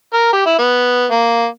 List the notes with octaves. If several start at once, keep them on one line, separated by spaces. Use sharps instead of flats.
A#4
G4
E4
B3
A#3